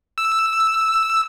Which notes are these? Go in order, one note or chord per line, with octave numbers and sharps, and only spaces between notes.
E6